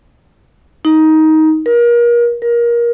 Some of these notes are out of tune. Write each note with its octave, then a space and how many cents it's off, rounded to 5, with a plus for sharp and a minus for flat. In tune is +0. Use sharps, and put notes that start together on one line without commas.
D#4 +15
A#4 +30
A#4 +20